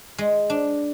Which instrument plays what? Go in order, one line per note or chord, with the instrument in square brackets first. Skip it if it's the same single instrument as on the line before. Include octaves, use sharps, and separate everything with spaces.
[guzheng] G#3
D4